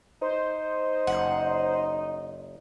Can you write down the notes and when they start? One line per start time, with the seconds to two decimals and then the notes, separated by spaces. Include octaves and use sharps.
0.22 D#4 C5
1.07 F#1 F#5